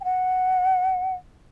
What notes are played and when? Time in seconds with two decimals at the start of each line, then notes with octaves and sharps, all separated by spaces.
0.01 G5
0.04 F#5